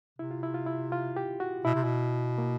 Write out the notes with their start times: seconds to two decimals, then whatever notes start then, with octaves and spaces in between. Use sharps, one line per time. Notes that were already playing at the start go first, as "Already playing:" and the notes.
0.19 C3 E4
0.31 F4
0.43 E4
0.54 F4
0.66 E4
0.92 F4
1.16 G4
1.40 F#4
1.65 B2 E4
1.74 C3
1.84 B2
2.38 A#3